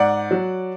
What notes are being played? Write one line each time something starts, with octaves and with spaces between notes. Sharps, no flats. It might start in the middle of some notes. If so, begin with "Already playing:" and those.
Already playing: G#2 D5 F#5
F#3